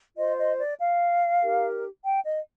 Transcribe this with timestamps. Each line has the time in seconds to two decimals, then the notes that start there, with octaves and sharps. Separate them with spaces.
0.17 F4 C5 D#5
0.38 D#5
0.58 D5
0.79 F5
1.42 D#4 G4 A#4
2.05 G5
2.25 D#5